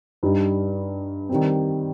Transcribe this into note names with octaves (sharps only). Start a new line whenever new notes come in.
G2 G3 D#4 G4
D#3 G3 C4